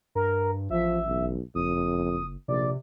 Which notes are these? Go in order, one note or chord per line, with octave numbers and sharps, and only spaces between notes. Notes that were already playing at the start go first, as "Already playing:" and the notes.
G2 A#4
A1 F3 E5
B1
F#1 F2 D#6
A#1 C3 D5